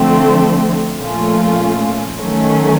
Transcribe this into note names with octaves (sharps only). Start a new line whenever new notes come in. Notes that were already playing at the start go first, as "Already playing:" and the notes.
Already playing: D3 F3 A3 C4
A#2 F3 A3 C#4 F4
D#3 F#3 A3 C#4